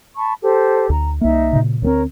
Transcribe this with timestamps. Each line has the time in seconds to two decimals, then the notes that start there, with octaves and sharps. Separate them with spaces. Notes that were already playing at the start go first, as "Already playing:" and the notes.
0.17 A5 B5 C#6
0.43 G4 A4 C5
0.90 D2 A#5
1.21 C2 A#3 D#4 E5
1.53 A#2 C#3
1.82 D2 A3 C4 A#4 C#5